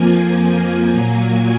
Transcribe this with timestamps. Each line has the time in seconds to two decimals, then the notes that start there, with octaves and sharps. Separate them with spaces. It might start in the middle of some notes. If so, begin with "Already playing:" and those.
Already playing: F2 F3 A#3 G#5
0.88 A#2 F#3 A#3